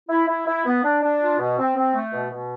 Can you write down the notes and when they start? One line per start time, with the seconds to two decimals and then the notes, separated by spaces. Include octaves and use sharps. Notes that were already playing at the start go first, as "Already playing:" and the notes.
0.09 E4
0.28 E4
0.47 E4
0.66 B3
0.83 D4
1.02 D4
1.21 F4
1.39 B2
1.58 C4
1.76 C4
1.94 A3
2.13 B2
2.31 B2